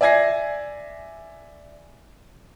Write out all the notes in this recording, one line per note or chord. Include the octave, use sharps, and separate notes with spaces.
D5 E5 G#5 G#6 A#6 C7